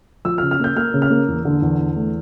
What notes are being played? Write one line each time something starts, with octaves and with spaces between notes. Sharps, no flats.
F3 E6
F6
C#3
F6
A#3 G6
A#3 F6
C#3
F6
A#3
E2
D3
E2
E2
A3